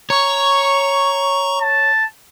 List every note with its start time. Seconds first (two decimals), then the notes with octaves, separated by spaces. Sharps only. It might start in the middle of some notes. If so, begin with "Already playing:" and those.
0.10 C#5 A#5 C#6
1.61 A5